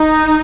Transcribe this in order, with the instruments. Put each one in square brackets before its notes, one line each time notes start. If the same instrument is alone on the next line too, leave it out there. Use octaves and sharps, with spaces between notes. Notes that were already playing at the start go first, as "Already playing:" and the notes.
Already playing: [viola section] D#4